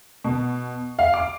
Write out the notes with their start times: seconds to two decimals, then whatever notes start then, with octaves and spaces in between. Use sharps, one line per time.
0.24 B2
0.99 F5
1.14 D6